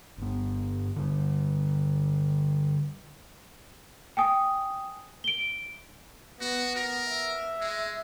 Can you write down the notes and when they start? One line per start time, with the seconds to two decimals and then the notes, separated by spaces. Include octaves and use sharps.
0.18 G1 B3
0.96 D3 G3
4.17 G5 G#5 D#6
5.24 D7 G7
6.41 B3 F#4
6.76 A#4
7.09 E5
7.60 G#3